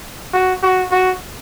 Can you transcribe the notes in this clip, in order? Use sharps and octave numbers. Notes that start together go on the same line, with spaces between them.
F#4
F#4
F#4